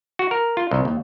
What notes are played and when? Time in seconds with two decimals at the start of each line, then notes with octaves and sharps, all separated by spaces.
0.19 F#4
0.31 A#4
0.57 F4
0.71 C2
0.85 D#2